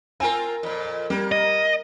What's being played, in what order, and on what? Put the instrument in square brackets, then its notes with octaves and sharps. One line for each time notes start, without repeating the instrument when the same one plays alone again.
[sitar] C4 F4 A#4 [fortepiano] G#5
[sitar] F2 A#2
[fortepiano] G3 [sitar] A#3
[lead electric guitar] D#5